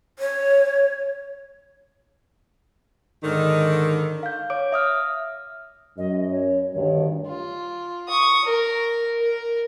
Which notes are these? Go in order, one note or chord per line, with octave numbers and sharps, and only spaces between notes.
C#5
G#2 D3 D#3
F5 G6
C#5 D6 D7
E5 D#6 F6
F#2 D#5
C#5
D2 G2 D#3 C#5
F4
C#6 D#6
A#4
A#4